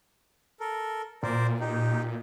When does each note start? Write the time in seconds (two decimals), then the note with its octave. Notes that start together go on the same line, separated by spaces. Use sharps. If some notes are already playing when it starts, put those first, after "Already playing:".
0.60 A4 A#4
1.23 A#2 A#4 C5 D5
1.60 D#4 G4